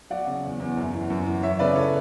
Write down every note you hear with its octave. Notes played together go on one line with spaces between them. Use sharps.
F#3 D5 F#5
C#3
E2
E2
F#2
E3
F#2
E3
E3 C#5 E5
C#3 B4 D5
A4 C#5